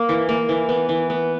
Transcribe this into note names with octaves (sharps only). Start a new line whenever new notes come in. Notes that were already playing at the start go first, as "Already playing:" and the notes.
Already playing: A#3
E3
A#3
E3
B3
E3
B3